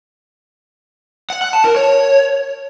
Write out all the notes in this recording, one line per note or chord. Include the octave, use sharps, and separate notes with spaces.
F#5
F#5
A5
A#4
C#5